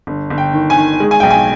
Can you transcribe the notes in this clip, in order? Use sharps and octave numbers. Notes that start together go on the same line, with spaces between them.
G1
G1
G5
D#3
G#5
D#3
G#3
G#5
B1 G5
G#5